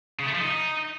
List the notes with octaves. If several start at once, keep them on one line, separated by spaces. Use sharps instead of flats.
C#3
A3
F3
D#4